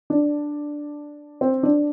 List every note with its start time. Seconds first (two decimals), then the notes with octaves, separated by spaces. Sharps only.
0.10 D4
1.41 C4
1.63 D4